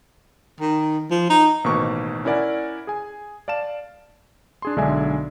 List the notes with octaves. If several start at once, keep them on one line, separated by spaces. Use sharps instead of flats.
D#3
F3
D#4
A1 B2 D#3 A#3 C5 C#6
C#4 E4 A#4 D5 F#5 G#5
G#4 G#5
D5 F5 A5 E7
D4 G#4 C6
B1 D3 G#3 D5 E5 G#5